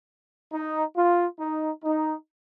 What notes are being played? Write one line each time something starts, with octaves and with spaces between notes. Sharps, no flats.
D#4
F4
D#4
D#4